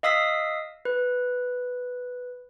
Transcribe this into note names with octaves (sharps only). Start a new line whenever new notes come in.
D#5 F5 D#6 E6 B6
B4